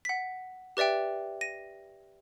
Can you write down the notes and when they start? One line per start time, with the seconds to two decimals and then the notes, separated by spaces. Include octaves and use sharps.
0.05 F#5 B6
0.77 G4 B4 D5 E5 G5
1.41 A#6 D#7